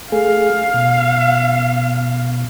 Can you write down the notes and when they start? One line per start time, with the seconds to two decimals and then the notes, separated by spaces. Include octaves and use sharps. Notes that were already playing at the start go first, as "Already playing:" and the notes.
0.12 A3 G#4 F5
0.74 B2